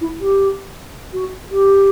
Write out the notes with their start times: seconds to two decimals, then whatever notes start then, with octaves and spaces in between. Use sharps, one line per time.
0.01 E4
0.20 G4
1.13 F#4
1.51 G4